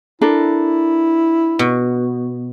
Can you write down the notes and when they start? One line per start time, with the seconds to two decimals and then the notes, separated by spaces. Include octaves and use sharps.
0.21 D4 E4 A4 A#4
1.59 B2